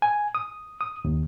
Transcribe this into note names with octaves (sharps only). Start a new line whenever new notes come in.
G#5
D#6
D#6
D#2